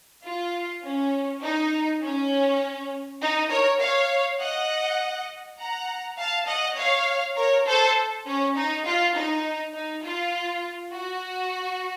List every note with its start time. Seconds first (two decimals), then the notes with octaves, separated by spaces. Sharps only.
0.24 F4
0.84 C#4
1.43 D#4
2.02 C#4
3.21 D#4
3.50 A#4 C#5
3.80 C#5 F5
4.40 D#5 F#5
5.58 F#5 A#5
6.18 F5 A5
6.47 D#5 F#5
6.77 C#5 F5
7.36 A#4 C#5
7.66 A4 C5
8.26 C#4
8.56 D#4
8.85 F4
9.15 D#4
9.74 D#4
10.04 F4
10.93 F#4